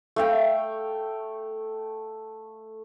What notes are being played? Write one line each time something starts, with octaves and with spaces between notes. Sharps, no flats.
A3 F5 G5